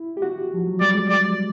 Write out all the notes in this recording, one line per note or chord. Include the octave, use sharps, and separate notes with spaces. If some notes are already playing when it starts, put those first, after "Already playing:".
Already playing: E4
G4
F#4
F3
F#3
G3 D5
G#3
D5